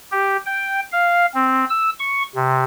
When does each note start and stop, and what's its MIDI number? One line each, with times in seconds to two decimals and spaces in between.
0.12 0.37 67
0.46 0.80 79
0.92 1.26 77
1.34 1.65 60
1.70 1.90 88
1.99 2.23 85
2.35 2.64 48